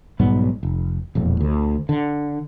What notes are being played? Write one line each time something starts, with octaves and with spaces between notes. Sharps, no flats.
B1 G#2 G3 B3
F1
E1 F2 A#2
D2
D3